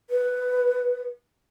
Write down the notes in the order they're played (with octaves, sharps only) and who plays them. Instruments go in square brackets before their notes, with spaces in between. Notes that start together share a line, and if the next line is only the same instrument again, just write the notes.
[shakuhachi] B4